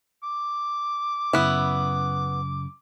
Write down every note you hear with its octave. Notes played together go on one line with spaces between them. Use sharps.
D6
F#2 C#3 B3 E4